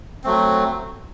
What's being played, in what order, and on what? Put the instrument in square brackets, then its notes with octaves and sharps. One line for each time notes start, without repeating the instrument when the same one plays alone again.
[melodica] F#3 A3 C4